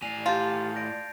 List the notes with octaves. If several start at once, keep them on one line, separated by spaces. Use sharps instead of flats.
A2 D5 G#5 C7 F7
F4 G4 A5 G6 A6
D5 G6 A#6 D7